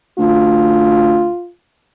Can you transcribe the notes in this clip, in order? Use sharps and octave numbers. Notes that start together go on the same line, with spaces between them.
D2 F4